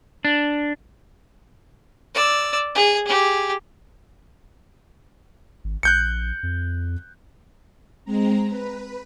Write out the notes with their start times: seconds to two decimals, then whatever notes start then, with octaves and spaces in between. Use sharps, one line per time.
0.25 D4
2.14 D5 E6
2.75 G#4
3.06 G4 G#4
5.64 G#1
5.83 A#1 F#6 G6 C#7
6.43 F2
8.05 G#3 C4 A#5
8.48 B4